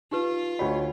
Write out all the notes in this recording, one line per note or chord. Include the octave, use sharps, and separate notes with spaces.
D#4 F4 G4 B4
D2 C#5 D#5 G5 B5